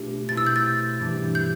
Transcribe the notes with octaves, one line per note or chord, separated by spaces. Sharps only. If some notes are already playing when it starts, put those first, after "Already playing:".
Already playing: B2 A3 B3 D4 F4 G4
B2 A3 C4 E4 A6
E6
G6
A6
G2 E3 G3 D4
G6